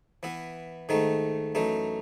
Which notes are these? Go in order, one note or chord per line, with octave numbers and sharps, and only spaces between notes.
E3 B3 E4
G#2 D#3 A3 D#4
F#2 E3 A3 D#4